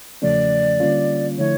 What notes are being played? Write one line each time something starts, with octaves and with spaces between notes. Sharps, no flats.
E2 C#3 F3 A3 C#4 D5
D3 G3 A#3 C#4 F4
D3 F3 A3 E4 C#5